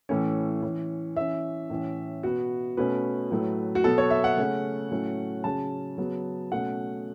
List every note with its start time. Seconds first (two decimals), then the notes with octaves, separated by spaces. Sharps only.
0.09 A2 E3 A3 C#4
0.63 E3 C#4
1.16 E3 C#4 E5
1.70 A2 E3 C#4
2.23 B2 B3 F#4
2.77 B2 A3 C#4 B4
3.31 A2 F#3 A3
3.75 F#4
3.84 B2 F#3 B3 A4
3.98 C#5
4.11 E5
4.24 F#5
4.37 C#3 A3 C#4
4.90 A2 F#3 A3 C#4
5.44 C#3 F#3 C#4 A5
5.98 C#3 F#3 B3
6.52 B2 A3 C#4 F#5